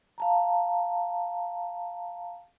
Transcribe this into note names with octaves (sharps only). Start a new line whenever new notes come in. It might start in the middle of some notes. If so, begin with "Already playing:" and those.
F5 A5 A#5